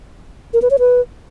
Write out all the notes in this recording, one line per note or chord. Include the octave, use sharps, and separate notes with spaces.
A#4
B4
C#5
B4